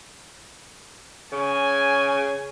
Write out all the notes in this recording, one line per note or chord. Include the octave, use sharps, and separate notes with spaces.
C#3 G#5